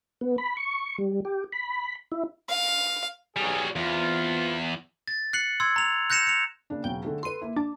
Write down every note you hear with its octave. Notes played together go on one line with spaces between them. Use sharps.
B3
B5
C#6
G3
G4
B5
E4
F5
B1 F#3 G3 G#4
E2 B3 C4 F4
A6
F#6 C7 C#7 F#7
C6 E6 G#6
A#5 F7
F#6 G6 A#6 C#7 E7 F7
C#7 F7
C#3 A#3 D4
E1 C#3 F#3 G5
D3 A3 G#4
A4 B4 C6 D#7
A#3 E4
D4 A5